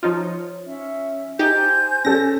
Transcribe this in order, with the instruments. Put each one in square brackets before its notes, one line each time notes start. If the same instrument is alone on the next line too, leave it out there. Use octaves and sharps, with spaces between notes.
[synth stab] F3 D#4 F4 [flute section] C#5
[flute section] C#4 E5
[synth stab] D#4 G4 [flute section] C5 G#5 G6
[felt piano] C#4 A4 [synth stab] A#6